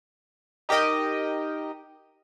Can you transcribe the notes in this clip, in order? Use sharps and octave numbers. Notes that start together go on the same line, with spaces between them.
D#4 G4 A#4 D#5 G5